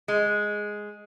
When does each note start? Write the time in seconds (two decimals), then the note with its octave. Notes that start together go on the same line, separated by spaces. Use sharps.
0.08 G#3